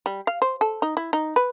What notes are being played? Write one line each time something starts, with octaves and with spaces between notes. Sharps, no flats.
G3
F5
C5
A4
D#4
E4
D#4
B4